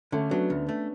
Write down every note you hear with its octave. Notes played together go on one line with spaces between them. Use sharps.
D3 A3 C#4
F#3 B3 D4
D2
A3